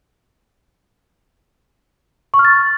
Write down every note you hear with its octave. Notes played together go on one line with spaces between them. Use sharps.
C#6
F6
A6